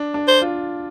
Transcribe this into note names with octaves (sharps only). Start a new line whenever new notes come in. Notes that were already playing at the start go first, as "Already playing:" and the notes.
Already playing: D4
D4
C5
F4